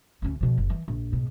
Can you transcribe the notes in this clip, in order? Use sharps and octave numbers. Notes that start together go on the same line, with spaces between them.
D2 C#4
B2 F3
F#1
E3
A#1
G#2 B2